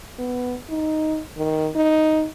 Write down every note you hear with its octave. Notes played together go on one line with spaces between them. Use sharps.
B3
D#4
D#3
D#4